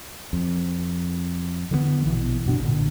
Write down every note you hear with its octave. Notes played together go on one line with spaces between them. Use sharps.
F2
D3 E3 G3 B3
A#1 B2 E3
F#2 B2 D4
A1 A#2 D3